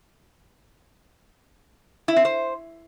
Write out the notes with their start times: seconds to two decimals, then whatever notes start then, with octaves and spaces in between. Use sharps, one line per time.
2.08 E4
2.16 C4
2.25 C5